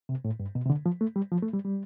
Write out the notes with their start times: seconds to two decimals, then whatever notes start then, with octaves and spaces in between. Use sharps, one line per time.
0.09 C3
0.25 A2
0.40 G2
0.55 B2
0.66 C3
0.70 D3
0.86 F3
1.01 A3
1.16 G3
1.32 F3
1.42 A3
1.53 G3
1.65 G3